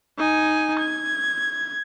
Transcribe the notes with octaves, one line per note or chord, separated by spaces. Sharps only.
D#4 G#5
G#6